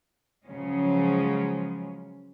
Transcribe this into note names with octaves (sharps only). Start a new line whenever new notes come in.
C#3 F3 F#3 G#3 C#4